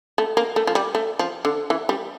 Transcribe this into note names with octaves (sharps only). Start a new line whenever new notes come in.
A3
A#3
A3
F3
G3
A3
F3
D3
E3
G3